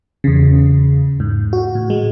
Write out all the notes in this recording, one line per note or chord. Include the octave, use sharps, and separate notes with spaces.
E2 C#3
G#2
F#4
A2
G#3